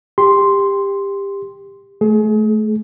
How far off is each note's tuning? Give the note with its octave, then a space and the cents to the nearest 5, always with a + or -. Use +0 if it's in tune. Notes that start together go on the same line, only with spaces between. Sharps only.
G4 +20 C6 +0
A3 -20 G#4 +35